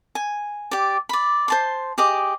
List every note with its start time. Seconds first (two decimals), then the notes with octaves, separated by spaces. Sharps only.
0.15 G#5
0.71 G4 D5
1.09 D5 B5
1.48 C5 A5 C6
1.98 G4 G#4 D#5 D6